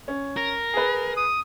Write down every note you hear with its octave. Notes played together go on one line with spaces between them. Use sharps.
C#4
A#4
G#4 B4
D#6